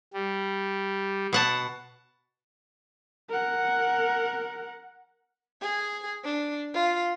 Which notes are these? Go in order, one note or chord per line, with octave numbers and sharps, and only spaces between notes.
G3
B2 F#5 A5
A#4 F#5
G#4
D4
F4